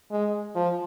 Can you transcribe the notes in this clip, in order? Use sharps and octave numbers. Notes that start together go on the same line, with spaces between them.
G#3
F3